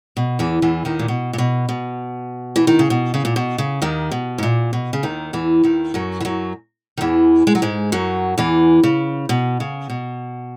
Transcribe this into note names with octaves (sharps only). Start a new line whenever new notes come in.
B2
E2 E3
E2 E3
D#2 D#3
A#2
B2
A#2
B2
B2
E3
D#3
C#3
B2
C#3
A#2
B2
C#3
D#2 D#3
B2
G#2
A#2
B2
C#3
D#2 D#3
E2 E3
D#2 D#3
F#2 F#3
E3
F#2 F#3
D#3
E2 E3
G#3
F#3
G#2 G#3
F#2 F#3
E2 E3
C#3
B2
C#3
B2